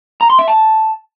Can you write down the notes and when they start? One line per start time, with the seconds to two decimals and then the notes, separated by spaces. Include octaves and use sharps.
0.21 A#5
0.30 C6
0.39 E5
0.48 A5